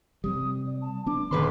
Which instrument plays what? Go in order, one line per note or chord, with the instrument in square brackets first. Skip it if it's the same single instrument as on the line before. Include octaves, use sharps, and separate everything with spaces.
[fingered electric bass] C3 G3 [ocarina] D#6
[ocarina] D5
A5
[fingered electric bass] B3 D4 [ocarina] D6
[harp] D#1 B4 C6 [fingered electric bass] D3